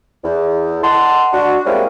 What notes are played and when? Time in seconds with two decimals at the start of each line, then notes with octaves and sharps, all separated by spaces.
0.24 E2
0.84 D#5 F#5 A5 C6
1.32 D4 F#4
1.65 G3 G#3 A#3 C4 C#4 E4